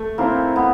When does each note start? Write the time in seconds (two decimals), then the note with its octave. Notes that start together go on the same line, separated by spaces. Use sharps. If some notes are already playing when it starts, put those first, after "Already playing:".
Already playing: A3
0.18 A#3 C4 E4 A4 C5
0.56 A3 B3